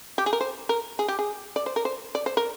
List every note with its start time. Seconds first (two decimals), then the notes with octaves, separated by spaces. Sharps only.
0.18 G4
0.26 G#4
0.33 A#4
0.41 C5
0.69 A#4
0.99 G#4
1.08 G4
1.19 G#4
1.56 D5
1.66 C5
1.76 A#4
1.85 C5
2.15 D5
2.26 C5
2.37 A#4